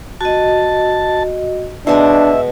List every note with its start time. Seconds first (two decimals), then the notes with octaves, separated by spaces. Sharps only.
0.21 F#4 D#5 A5
1.87 B2 G#3 D4 E5 D6